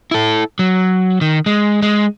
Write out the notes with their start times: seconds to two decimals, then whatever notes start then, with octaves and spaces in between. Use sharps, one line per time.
0.11 E4 A4
0.59 F#3
1.21 D#3
1.46 G#3
1.82 G#3